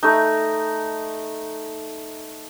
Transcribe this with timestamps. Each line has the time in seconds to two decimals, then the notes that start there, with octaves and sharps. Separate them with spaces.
0.03 A3 D#4